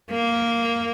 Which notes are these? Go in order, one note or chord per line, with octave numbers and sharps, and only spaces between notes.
A#3